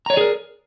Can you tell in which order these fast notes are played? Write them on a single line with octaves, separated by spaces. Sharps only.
A#5 C#5 D5 G#4 A#4